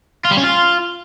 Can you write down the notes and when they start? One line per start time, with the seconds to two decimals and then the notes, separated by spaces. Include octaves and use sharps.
0.25 F4
0.31 G3
0.37 C#4
0.43 F4